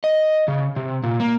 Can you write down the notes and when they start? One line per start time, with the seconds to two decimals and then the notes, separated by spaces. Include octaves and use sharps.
0.04 D#5
0.48 C#3
0.76 C3
1.03 A#2
1.20 A#3